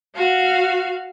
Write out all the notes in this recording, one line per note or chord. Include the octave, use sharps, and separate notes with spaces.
F#4 F5